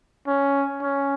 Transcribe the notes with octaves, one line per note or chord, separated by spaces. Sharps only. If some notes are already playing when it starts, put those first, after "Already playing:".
C#4
C#4